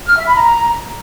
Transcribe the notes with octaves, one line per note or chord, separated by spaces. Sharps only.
F6
E5
B5
A#5